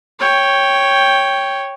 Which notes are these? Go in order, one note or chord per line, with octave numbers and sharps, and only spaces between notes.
C#5 G5